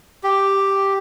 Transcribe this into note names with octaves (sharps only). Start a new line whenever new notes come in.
G4